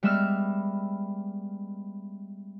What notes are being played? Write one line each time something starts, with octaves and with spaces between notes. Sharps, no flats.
G3 G#3 B3 E5 E6 F6